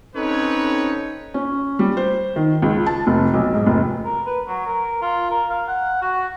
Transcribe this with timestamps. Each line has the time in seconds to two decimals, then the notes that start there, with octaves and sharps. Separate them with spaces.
0.15 C4 C#4 D#4 A4 B4 C#5
1.34 C#4
1.79 G3
1.97 C5
2.36 D#3
2.62 C#2
2.86 A5
3.07 F1
3.34 B1
3.54 G#2
3.67 F1
4.04 A#4
4.26 B4
4.47 F#3
4.67 A#4
5.02 F4
5.30 A#4
5.50 F5
5.68 F#5
6.02 F#4